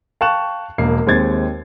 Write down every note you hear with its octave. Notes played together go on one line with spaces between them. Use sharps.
F5 G5 A5 C#6 F#6 E7
E1 A#3 C7
D#2 G#3 C4 G#6 A6